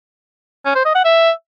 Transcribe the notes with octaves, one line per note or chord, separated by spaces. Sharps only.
C#4
C5
D#5
F#5
E5